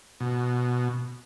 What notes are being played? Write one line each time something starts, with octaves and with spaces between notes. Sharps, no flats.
B2